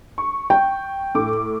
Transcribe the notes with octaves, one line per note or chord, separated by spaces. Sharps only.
C#6
G5
A2 D6